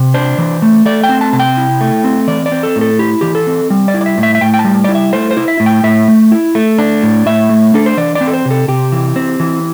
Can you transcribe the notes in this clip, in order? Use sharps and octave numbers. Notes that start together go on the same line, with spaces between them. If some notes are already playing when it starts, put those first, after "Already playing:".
Already playing: C3
D4 C5
E3
A3
A3 D5
G5
C4
A5
C3 A5
G5
E4
A3
C4
E3 D5
D5
C4
A4
A2
A4
E4 G4
E3 G4
A4
C4
G3
D5
E4
D5
E5
A2
E5
E5
A2 G5
G5
A5
G3
E4 D5
E5
A3 C5
C5
E4
E5
A2
G5
A2 E5
A3
E4
A3
D4
A2
A2 E5
A3
D4 A4
C5
E3 D5
D5
C4
A4
C5
C3
A4
C3 G4
E3
C4
E3